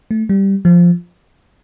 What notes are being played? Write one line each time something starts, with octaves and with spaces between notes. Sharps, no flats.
A3
G3
F3